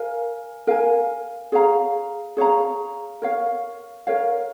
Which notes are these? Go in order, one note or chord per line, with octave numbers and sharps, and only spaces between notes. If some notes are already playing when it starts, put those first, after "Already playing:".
Already playing: A#4 F5 G#5
A#4 F5 G#5
G#4 C#5 F5 A#5
G#4 C#5 F5 A#5
A#4 C#5 F5
A#4 C#5 F5